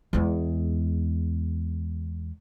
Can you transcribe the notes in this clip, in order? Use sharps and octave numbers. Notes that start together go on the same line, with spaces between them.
E2 G#3